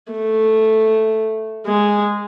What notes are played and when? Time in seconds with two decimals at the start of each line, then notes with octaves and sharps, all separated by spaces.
0.12 A3
1.66 G#3